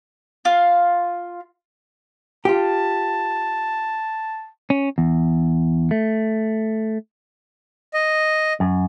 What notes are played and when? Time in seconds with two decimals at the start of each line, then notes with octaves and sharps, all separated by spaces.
0.45 F4 F5
2.45 F4 G4 A5
4.70 C#4
4.98 E2
5.91 A3
7.94 D#5
8.60 F#2